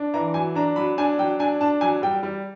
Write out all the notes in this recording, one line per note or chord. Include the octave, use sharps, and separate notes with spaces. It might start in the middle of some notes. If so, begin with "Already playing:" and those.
Already playing: D4
E3 A#5
F#3 G#5
D4 A#5
F#3 B5
D4 G#5
F#3 G5
D4 G#5
D4 A5
F#3 G#5
G3 G5
G3